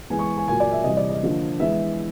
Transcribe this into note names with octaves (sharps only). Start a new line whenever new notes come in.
E3 G#3 B3 G#5
C#6
G#5
A#2 F#3 A#3 G#5
D5
E5
C3 E3 G3 D#5
D5
D#5
D3 F3 A#3
E3 G#3 B3 E5